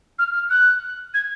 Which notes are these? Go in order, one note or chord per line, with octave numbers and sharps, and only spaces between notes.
F6
F6
F#6
G#6